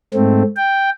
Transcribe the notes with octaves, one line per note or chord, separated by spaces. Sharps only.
G#2 A3 C4
G5